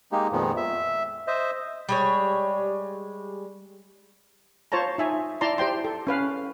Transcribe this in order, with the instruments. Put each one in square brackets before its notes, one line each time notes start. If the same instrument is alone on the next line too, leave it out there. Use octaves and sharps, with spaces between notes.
[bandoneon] G#3 A#3 D#4 G4
F2 A#2 D#3 F3 G#3 B3
E5
C5 D#5 E5
[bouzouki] G3 G#3 C#5
[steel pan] F4 C5 C#5 A5 A#5
D#4 E5 G#5
E4 D5 A5 A#5 C6
G4 C5 G5 C6
A4
C#4 B4 F5